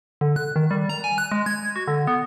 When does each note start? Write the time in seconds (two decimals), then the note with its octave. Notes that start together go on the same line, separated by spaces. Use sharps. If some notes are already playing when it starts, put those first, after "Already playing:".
0.21 D3
0.36 F#6
0.56 D#3
0.71 G3
0.89 A#5
1.04 G#5
1.18 F#6
1.32 G#3
1.46 G#6
1.76 F#4
1.87 D3
2.07 B3